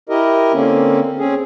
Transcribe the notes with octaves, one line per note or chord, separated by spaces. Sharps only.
E4 G4 A#4 D#5
D3 A#3 C4 C#4
C4 C#4 G#4